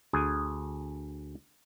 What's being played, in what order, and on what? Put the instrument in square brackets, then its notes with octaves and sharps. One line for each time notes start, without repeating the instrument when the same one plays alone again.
[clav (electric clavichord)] D2 G#4 G#5